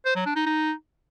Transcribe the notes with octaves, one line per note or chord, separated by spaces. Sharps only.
C5
F#3
D4
D#4
D#4